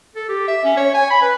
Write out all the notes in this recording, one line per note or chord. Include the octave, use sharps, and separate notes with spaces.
A4
G4
E5
C#4
C#5
G#5
B5
B4